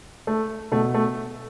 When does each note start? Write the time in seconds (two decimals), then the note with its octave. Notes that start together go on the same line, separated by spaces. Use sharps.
0.27 A3
0.72 B2 A3
0.94 A3